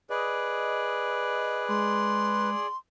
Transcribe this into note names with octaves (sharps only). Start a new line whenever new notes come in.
G#4 B4 D5 D#5
G#3 C6